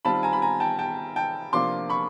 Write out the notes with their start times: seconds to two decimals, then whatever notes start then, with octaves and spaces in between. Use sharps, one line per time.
0.05 D#3 G3 C4 F4 A5 B5
0.23 G#5 A#5
0.33 B5
0.42 G#5 A#5
0.60 G5 A5
0.79 G5 A5
1.16 G5 A5
1.53 C3 F3 A#3 D4 F4 C6 D6
1.89 B5 C#6